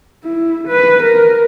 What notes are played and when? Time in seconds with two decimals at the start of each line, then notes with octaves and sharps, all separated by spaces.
0.25 E4
0.68 B4
1.02 A#4